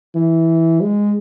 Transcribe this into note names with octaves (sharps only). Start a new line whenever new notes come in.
E3
G#3